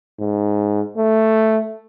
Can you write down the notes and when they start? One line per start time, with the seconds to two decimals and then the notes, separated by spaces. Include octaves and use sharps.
0.20 G#2
0.97 A3